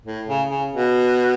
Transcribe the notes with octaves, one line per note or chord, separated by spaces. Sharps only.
A2
C#3
C#3
B2